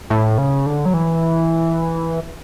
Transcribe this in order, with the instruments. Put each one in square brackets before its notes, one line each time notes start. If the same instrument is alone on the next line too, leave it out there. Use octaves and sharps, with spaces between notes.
[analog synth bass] A2
C#3
D3
F#3
E3